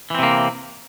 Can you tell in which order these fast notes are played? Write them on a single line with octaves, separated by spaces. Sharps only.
E3 C4 C3 A#3